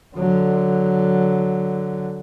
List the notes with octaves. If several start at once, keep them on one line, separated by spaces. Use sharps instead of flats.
D3 F#3